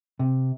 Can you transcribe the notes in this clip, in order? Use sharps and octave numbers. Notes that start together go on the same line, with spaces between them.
C3